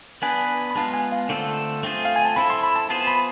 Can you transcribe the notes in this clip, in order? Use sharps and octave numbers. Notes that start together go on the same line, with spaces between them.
B3 D4 G#4 B4 G#5
B5
G#3 B3 F4 A5
G#5
F5
D3 A3 C4 F4 A4
A3 C4 F4 G#4
F5
G#5
A5
C4 E4 A4 B5
C6
B5
A5
B3 F4 G#4 C5 A5
B5